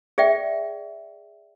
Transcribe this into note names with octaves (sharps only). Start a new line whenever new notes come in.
G#4 D5 E5 G5